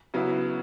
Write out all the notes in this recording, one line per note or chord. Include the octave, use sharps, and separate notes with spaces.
C#3 F#3 B3 E4